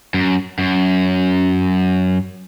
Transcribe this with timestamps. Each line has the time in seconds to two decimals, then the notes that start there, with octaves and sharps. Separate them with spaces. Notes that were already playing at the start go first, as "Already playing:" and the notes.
0.14 F#2
0.59 F#2